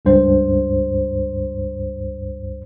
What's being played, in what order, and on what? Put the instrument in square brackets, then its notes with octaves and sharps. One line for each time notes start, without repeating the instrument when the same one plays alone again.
[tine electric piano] C#2 G2 C5